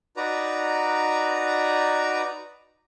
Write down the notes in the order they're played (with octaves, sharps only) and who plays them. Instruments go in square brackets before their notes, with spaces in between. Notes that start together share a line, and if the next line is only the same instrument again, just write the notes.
[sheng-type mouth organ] D#4 F#4 B4 D5 A#5